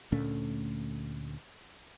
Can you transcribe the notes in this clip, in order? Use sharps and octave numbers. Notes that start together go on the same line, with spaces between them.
D2 A#2 A3 C#4